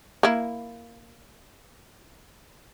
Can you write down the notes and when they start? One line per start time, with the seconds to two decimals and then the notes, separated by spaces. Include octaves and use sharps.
0.23 A#3 E4